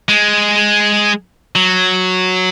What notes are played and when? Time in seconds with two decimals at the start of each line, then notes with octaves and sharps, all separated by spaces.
0.09 G#3
1.55 F#3